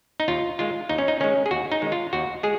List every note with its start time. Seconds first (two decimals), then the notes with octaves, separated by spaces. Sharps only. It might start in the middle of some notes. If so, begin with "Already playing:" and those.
0.20 D#4
0.28 D#2 F4
0.59 D#3 G#3 F4
0.89 D#2 D#4
0.98 C#4
1.08 D#4
1.20 D#3 G#3 C#4
1.46 G#4
1.51 D#2 F#4
1.72 D#4
1.82 D#3 G#3
1.92 F4
2.13 D#2 F#4
2.43 G#3 G#4